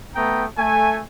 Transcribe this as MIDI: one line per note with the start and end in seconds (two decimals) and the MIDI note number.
0.15 0.46 57
0.15 0.46 59
0.15 0.46 79
0.15 0.46 82
0.15 0.46 87
0.58 1.01 57
0.58 1.01 80